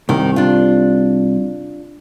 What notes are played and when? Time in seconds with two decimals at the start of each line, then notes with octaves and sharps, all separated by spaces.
0.09 C2 D#3
0.36 D4 F4